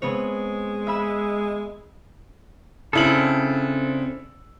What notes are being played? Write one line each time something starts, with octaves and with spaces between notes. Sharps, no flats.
G#3 B3 C4 C#5
E5 B5 E6
C#3 C4 D4 E4 A4 F#7